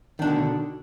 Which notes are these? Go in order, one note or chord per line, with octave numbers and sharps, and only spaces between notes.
B2 D3 D#3 D4